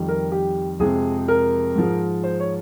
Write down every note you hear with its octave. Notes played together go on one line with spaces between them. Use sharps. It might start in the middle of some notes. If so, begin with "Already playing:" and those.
Already playing: F2 D#3 G3
A#4
G4
F2 C3 F3 G#3 G#4
A#4
G#2 F3 G#3
C5
C#5